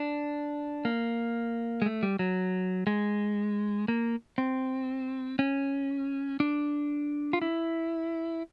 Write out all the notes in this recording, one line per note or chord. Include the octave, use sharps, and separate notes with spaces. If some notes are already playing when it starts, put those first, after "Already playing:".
Already playing: D4
A#3
G#3
A3
G3
F#3
G#3
A#3
C4
C#4
D4
F4
E4